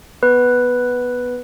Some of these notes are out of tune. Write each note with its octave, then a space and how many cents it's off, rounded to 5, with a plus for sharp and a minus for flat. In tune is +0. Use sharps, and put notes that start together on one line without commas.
B3 +0 B4 +0